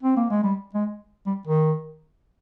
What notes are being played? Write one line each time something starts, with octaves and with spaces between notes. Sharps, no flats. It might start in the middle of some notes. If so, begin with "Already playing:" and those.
C4
A#3
G#3
G3
G#3
G3
D#3